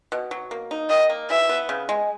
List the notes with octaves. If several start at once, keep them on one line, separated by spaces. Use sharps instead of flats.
B2
F#3
A#3
D#4
D#3 D#5
A#3
E3 E5
B3
C#3
G#3